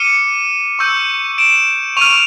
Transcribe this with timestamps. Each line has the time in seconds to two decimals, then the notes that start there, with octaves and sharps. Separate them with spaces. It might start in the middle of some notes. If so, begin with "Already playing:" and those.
Already playing: D6 F6 C#7 D#7
0.79 C#6 E6 G6
1.38 D7 E7
1.97 C#6 F6 D#7 F7